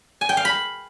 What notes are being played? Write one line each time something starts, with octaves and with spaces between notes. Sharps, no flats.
G#5
G5
F5
B5